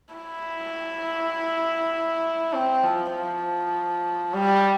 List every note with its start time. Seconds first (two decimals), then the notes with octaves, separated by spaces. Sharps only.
0.14 E4
2.53 C4
2.84 F3
3.13 F3
4.33 G3